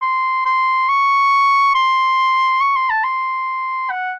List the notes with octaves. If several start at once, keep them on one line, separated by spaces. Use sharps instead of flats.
C6
C6
C#6
C6
C#6
C6
A5
C6
F#5